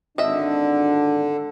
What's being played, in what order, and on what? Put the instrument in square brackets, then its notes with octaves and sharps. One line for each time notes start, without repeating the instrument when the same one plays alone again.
[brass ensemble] G#1 D4 [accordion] D3 [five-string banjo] D#5 E5